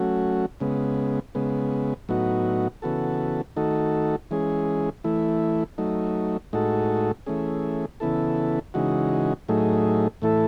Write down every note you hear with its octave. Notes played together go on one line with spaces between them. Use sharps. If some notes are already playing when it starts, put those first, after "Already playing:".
Already playing: F#3 A3 C#4 F#4
C#3 G#3 B3
C#3 G#3 B3
A2 F#3 B3 D#4 F#4
C#3 E3 B3 F#4 A4
D#3 A3 D#4 F#4 A4
E3 G#3 C#4 G#4
E3 A3 E4
F#3 A3 D#4
A2 G#3 D#4 F#4 A4
E3 A3 C#4 G#4
C#3 E3 B3 E4 A4
C#3 E3 G#3 D#4 F#4
A2 F#3 A3 D#4 G#4
A2 E3 A3 E4 A4